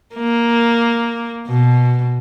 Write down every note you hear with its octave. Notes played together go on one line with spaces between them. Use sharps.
A#3
B2